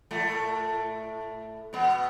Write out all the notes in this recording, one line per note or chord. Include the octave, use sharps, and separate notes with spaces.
A2 A3
B2 B3